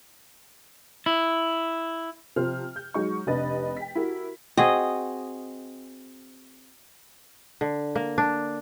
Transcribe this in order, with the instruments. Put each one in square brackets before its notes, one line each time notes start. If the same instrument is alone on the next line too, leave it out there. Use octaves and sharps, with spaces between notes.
[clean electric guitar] E4
[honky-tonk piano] C3 F3 C5 F6
G6
F#3 G#3 D#4 C#6
F1 C3 D4 B4 D#5 A6
G5 B6
E4 F#4 G4 A#4
[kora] C4 F#4 G#4 [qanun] D#5
[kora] D3
A#3
D4